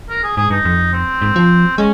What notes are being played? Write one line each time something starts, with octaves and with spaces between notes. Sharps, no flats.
A#4
G#4
G#2 G#4
G2 D#4
F2
C4
G#2
F3
G#3 C#4